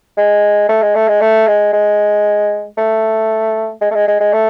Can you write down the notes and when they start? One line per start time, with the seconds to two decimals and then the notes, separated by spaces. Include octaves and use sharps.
0.17 G#3
0.69 A3
0.82 G#3
0.95 A3
1.08 G#3
1.21 A3
1.47 G#3
1.73 G#3
2.78 A3
3.81 G#3
3.91 A3
3.95 G#3
4.08 G#3
4.20 G#3
4.33 A3